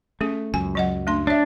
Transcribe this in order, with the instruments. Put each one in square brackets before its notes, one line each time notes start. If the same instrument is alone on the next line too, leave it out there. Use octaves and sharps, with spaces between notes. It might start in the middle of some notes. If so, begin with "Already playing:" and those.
[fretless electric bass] A3 [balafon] C#4 G#4
[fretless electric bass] C#2 F#2 [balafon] G#5
[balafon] F#3 D#5 F#5
A3 D4 C6
[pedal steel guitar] D4 [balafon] C#5 E5